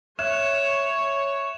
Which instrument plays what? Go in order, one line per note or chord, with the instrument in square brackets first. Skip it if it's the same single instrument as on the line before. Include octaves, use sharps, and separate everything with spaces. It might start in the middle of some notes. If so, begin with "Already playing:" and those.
[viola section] C#5 [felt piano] E5 F#6 G#6 [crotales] E7